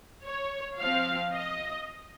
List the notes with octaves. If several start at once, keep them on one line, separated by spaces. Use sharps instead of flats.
C#5
F3 C4 F5
D#5